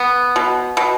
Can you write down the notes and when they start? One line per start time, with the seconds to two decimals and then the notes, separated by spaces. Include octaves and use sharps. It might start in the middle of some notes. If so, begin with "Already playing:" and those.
Already playing: B3
0.36 B2
0.77 B2